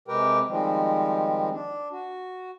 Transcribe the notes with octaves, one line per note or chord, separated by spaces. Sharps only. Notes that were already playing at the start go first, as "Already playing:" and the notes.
C3 G#3 G4 A#4 B4 G5
D#3 F3 G3 G#3 C4
D4
F#4